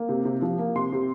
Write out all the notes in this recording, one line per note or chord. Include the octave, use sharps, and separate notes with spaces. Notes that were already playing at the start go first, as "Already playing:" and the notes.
Already playing: A#3
C3
C3
F3
A#3
C3 C6
C3